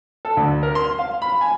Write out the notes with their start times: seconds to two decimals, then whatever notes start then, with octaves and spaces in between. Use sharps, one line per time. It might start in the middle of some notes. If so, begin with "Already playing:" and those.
0.25 A4
0.37 D2
0.63 A#4
0.75 C6
0.99 F5
1.22 B5
1.41 G#5